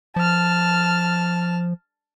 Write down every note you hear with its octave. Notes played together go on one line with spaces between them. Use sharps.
F3 A5 F6